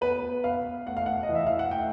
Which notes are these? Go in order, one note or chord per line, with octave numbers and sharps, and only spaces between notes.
B3 B4
B3 F5
A3 F#5
F5
F#5
D#5
E3
E5
F5
F#5
A3 G5